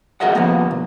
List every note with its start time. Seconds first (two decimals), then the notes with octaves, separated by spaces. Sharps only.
0.20 F#4 G#4 A#4 D#5 E5 F#5
0.35 D#2 F3 A#3 B3
0.71 B1